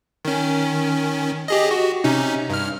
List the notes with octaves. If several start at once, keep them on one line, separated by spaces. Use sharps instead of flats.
D#3 C#4
G4 G#4 D#5
F#4
C3 C#4 D#4
G2 F6